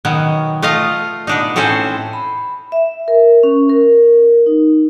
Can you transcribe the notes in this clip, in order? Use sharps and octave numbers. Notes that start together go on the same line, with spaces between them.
B2 D#3 F#3
A3 F4 D#5 F5
B2 D4 D#4
A2 C4 C#4 A4 C5
B5
E5
A#4
C#4
A#4
D#4